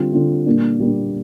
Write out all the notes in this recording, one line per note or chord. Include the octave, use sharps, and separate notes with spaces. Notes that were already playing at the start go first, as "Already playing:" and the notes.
Already playing: D3 G3 C4 F4
D3 G3 C4 F4
A#2 G3 A#3 D4
A#2 G3 A#3 D4